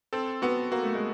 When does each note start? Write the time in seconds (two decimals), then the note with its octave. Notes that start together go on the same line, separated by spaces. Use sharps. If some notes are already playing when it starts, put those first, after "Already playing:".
0.13 C4 A4
0.42 B3 F#4
0.72 A#3 F#4
0.84 A3
0.95 G#3